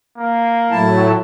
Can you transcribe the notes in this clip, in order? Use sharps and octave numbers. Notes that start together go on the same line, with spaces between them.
A#3
A2 F#3 A3 E4 A5